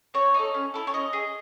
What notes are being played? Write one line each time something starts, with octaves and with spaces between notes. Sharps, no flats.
C4 C#5
D#4 A4
C#4
E4 A4
C#5
C#4 D#5
G#4